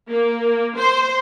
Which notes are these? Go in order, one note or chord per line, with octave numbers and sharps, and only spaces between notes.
A#3
C5